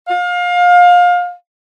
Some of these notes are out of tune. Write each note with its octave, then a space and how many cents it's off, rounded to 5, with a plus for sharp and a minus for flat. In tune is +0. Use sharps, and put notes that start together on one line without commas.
F5 +25